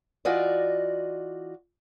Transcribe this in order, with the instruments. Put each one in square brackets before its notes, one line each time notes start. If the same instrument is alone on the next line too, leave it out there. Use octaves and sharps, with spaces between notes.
[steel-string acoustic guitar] E3 F4 F#4 D5 D#5